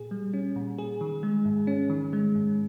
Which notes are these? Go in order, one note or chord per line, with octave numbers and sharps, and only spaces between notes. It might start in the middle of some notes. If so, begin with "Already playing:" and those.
Already playing: A#2 G#4
G3
C#4
A#2
G#4
D#3
G#3
G#2
C#4
D#3
G#3
G#2